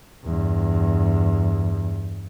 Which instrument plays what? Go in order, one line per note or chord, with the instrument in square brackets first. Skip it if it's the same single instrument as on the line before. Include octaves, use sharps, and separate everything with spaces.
[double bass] E2 G2